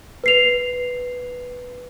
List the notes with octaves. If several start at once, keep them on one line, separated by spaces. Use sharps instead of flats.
B4 C7 F7